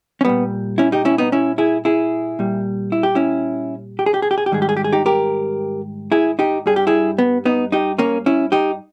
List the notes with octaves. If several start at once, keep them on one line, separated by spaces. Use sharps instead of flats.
C#4
A#2 G3 B3
C#4 E4
D#4 G4
C#4 E4
B3 D#4
C#4 E4
E4 G#4
E4 G#4
A#2 G3
E4
G4
C#4 E4
G4
G#4
G4
G#4
G4
G#4
G4
G#2 D#3 G3 G#4
G4
G#4
G4
G#4
D#4 G4
G4 A#4
E4 G#4
D#4 G4
G2 G3 G#4
G4
E4 G#4
B3
B3 D#4
D#4 G4
A#3 C#4
C#4 E4
D#4 G4